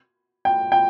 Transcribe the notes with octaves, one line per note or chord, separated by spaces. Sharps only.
G5
G5